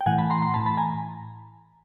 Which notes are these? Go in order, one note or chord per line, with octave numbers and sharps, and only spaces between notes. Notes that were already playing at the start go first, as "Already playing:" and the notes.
G5
A2 E3 F#5 G#5
A5 B5
A#5 C6
A#5 C6
A2 E3 A5 B5
A5 B5
G#5 A#5